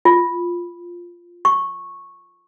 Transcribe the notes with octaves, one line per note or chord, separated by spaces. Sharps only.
F4
C#6